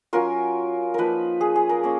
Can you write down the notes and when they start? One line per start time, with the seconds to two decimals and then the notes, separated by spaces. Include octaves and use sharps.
0.13 F#3 C#4 F4 A#4
0.94 F3 A#3 D#4 A#4 B4
1.41 G#4
1.56 G#4
1.69 A#4
1.84 A#3 C#4